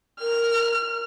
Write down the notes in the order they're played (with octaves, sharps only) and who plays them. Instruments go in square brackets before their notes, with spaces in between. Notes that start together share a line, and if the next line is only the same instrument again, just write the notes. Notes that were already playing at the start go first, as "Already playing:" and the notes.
[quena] A#4 [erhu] F6